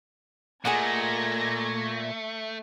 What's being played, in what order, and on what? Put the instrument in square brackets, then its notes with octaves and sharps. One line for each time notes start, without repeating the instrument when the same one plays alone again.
[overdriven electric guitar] A#2 [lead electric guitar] A3 [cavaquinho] G#4 D#5 F#5 [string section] G#6 A#6